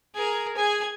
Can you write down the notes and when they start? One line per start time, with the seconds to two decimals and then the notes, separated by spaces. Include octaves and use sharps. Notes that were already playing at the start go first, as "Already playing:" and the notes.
0.15 G#4 A#4
0.57 G#4 G#5